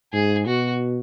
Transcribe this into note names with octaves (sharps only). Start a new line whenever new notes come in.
G#2 G#4
B2 F#4